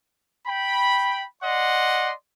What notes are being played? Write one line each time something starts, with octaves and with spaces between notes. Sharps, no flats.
G5 B5
D5 D#5 F#5 C6